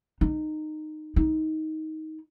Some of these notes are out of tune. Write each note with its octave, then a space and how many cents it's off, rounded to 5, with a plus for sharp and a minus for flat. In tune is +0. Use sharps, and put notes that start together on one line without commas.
D#4 -15
D#4 +15